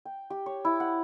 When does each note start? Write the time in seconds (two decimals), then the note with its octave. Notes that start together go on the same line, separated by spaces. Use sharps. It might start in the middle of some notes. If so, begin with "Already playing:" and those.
0.05 G5
0.30 G4
0.46 C#5
0.65 E4
0.80 F#5